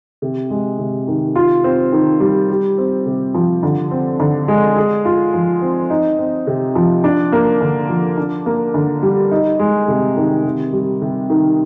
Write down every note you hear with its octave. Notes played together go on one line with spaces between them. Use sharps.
C3
G#3
C3
D#3
F4
C4
D#3
G3
G4
C4
C3
F3
D3
C4
D3
G#3
G#4
F4
F3
C4
D#4
C4
C3
F3
D4
A#3
D3
F3
D4
A#3
D3
G3
D#4
G#3
C3
D#3
C3
G3
C3
D#3